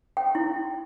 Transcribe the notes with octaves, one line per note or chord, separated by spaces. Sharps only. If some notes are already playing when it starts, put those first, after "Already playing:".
G5
E4